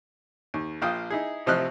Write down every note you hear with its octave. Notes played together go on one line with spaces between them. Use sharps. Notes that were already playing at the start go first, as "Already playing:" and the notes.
D#2
A#1 F4 F5 G5 D#6
D#4 E4 G#4
A1 C3 F3 D#5 F6 F#6